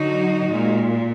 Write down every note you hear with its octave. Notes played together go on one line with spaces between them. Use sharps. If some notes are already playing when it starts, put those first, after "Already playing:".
Already playing: D3 F#3 D#4 F#4
A#2 G#3